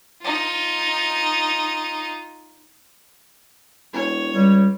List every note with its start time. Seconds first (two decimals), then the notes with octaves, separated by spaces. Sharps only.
0.22 D#4 F4
3.93 E1 C#5
4.34 C#2 G3